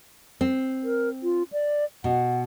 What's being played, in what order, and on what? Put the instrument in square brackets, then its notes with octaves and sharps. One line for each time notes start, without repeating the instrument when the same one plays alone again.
[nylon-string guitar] C4
[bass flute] A#4
F4
D5
[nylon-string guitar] B2 [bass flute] F#5